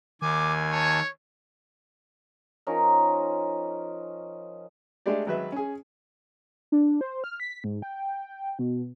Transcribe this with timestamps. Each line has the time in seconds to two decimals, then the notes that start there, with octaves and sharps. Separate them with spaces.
0.22 D#2 D#3 G#5 D6
0.72 C#5 A5
2.67 F3 C#4 D#4 A#4
5.06 G#3 A3 D4 G4 D5
5.27 G#1 F#3 B4 E5
5.52 C#4 G#4
6.72 D4
7.01 C5
7.24 F6
7.40 B6
7.64 G#2
7.82 G5
8.59 B2